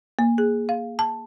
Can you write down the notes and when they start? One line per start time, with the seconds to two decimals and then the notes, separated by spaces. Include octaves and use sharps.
0.19 A#3
0.38 G#4
0.69 F5
0.99 A5